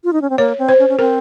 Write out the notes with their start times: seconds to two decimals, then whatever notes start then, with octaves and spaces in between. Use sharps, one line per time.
0.04 F4
0.13 D#4
0.22 C#4
0.30 C4
0.38 A#3 C#5
0.58 C4
0.69 C5
0.79 C#4
0.89 C#4
0.99 C4 A#4